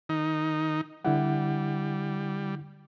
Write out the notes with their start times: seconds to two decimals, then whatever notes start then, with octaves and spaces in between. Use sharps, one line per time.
0.09 D#3 D#4
1.05 D3 G3 E4 F#5